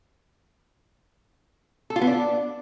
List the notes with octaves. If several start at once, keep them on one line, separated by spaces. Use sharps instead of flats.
A4
F4
B3
D4